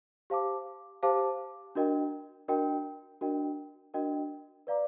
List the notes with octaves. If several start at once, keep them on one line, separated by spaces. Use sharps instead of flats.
G4 C5 F5 A5 D6
G4 C5 F5 A5 D6
D4 F#4 A#4 D#5 G5
D4 F#4 A#4 D#5 G5
D4 F#4 A#4 D#5 G5
D4 F#4 A#4 D#5 G5
B4 D5 F5 A#5 D6